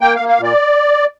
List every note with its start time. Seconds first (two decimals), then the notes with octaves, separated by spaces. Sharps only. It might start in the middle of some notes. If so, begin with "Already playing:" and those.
0.01 A#3 G5
0.16 F5
0.20 A#3
0.29 F5
0.38 A#2 D5